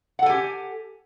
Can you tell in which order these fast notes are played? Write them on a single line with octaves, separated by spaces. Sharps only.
F#5 A4 G#5 G4